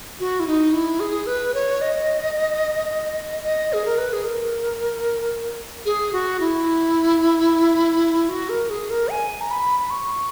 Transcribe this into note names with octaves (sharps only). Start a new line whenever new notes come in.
F#4
E4
D#4
E4
G#4
B4
C#5
D#5
D#5
G#4
A#4
B4
G#4
A#4
G#4
F#4
E4
F#4
A#4
G#4
A#4
G#5
A#5
B5
B5
C#6